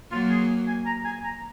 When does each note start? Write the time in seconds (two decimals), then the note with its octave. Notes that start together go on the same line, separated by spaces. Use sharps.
0.11 F#3 A#3 F4
0.30 G#4
0.67 G#5
0.86 A#5
1.05 G#5
1.24 A#5